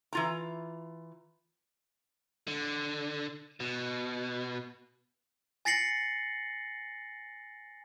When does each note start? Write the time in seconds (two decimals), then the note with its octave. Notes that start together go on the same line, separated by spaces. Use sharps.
0.13 E3 F4 A#5
2.48 D3
3.60 B2
5.65 G#5 A6 A#6 C7 C#7 F#7